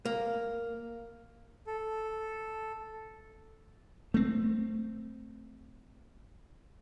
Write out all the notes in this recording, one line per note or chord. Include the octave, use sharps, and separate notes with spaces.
A#3
A4
A3 C4